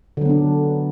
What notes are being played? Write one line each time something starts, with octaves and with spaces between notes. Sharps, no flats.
D3 F#3 B3 D4